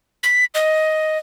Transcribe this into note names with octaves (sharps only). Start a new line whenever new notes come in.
B6
D#5